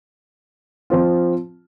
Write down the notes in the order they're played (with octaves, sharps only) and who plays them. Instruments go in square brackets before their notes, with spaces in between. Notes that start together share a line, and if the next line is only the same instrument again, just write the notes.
[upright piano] F3 C4 F4